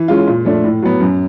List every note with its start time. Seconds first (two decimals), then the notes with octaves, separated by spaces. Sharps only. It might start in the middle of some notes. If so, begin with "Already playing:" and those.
Already playing: E3
0.08 G#3 C#4 F4
0.27 A#2
0.45 F3 A3 D4
0.64 A2
0.82 F#3 B3
1.00 F#2